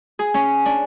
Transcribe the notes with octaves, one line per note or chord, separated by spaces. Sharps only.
G#4
C#4
D4